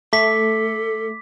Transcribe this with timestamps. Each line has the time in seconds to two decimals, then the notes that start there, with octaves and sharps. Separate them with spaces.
0.13 A3 A4 D6 B6